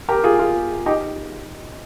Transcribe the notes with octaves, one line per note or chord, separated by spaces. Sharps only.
G4 A#4
F4 G#4
F4 G#4
D#4 G4